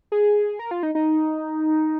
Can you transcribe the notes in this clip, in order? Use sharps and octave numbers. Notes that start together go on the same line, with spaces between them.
G#4
A#4
F4
D#4
D#4